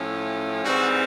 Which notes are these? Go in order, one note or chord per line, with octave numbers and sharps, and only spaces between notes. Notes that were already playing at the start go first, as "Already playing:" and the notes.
Already playing: A2 F3 A3 C#4
G#2 E3 G3 C4 F#4